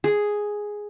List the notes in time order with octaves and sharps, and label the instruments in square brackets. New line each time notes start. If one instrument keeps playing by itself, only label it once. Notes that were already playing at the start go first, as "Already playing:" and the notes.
[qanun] G#4